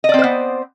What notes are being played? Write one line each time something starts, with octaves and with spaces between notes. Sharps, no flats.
B3 C4 C5 D5 D#5